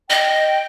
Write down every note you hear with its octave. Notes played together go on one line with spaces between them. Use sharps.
D#5 G5